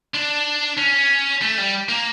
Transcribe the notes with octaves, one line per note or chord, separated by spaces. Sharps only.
D4
C#4
A3
G3
A#3